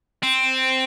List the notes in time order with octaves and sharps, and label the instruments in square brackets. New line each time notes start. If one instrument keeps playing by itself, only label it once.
[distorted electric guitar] C4